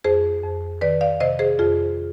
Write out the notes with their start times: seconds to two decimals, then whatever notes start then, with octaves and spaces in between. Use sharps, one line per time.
0.04 F2 G#4 C5
0.43 F2
0.81 D#3 B4 D5
1.01 D5 F5
1.20 C3 C5 D#5
1.39 G#4 C5
1.59 F2 F4 G#4